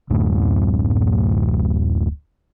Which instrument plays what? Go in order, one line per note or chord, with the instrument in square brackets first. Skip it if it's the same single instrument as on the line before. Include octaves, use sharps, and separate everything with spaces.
[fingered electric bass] D1 F#2 A2